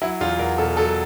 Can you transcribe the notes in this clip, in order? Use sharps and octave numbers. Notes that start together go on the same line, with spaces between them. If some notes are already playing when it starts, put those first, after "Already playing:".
F#3 E4
E2 F4
E2 A#4
B2 A4
F#3 A4